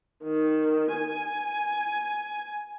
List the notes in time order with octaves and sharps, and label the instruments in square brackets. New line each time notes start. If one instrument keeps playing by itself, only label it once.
[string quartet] D#3
G#5